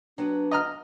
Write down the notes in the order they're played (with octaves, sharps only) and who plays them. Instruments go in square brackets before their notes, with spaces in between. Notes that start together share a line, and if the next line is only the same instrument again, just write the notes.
[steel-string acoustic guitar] F#3 B3 [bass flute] D4
[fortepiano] D#5 A#5 F6